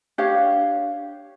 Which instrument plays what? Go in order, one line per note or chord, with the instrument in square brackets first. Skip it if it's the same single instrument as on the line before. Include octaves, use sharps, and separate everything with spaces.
[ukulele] D4 G4 C#5 F5